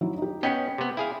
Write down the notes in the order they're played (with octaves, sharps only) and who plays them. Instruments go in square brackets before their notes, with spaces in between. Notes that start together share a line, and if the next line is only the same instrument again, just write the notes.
[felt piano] F#3 D#4 E4
D#4 G4
[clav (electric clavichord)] B3 C#4 D#5 [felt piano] G5 B6 C#7
[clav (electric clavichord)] C3 B3
E4 G#4 F5